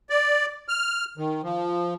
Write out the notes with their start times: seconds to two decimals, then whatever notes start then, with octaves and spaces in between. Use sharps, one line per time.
0.10 D5
0.68 F6
1.17 D#3
1.43 F3